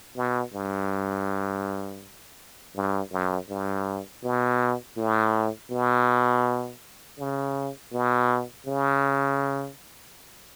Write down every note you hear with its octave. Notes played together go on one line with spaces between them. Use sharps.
B2
G2
G2
F#2
G2
B2
A2
B2
C#3
B2
C#3